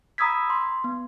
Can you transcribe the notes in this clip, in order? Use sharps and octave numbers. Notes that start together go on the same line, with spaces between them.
A#5 B5 D#6 E6 G#6 B6
C6
B3